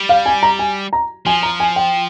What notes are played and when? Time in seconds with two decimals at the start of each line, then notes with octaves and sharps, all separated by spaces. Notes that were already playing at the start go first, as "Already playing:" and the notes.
Already playing: G3
0.09 F5
0.26 G#5
0.43 A#5
0.59 G#5
0.93 A#5
1.26 F3 G#5
1.43 A#5
1.60 G#5
1.76 G5